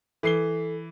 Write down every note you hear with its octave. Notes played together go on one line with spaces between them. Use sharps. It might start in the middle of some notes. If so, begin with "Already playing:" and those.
E3 A4 C7 G7